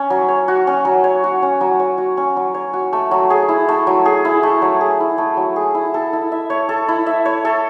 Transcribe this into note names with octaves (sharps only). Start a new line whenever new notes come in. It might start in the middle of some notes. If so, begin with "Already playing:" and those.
Already playing: C#4
F#3
C#5
F#4
C#4
F#3
C#5
F#4
C#4
F#3
C#5
F#4
C#4
F#3
C#5
F#4
A3
F#3
G#4
E4
A3
F#3
G#4
E4
A3
F#3
G#4
E4
A3
F#3
G#4
E4
A4
E4
E5
C#5
A4
E4
E5
C#5
A4